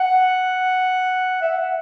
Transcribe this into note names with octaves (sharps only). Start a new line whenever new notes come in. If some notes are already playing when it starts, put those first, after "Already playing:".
Already playing: F#5
E5
F#5